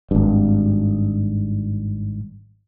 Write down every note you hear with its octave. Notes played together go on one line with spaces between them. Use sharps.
G#1 G2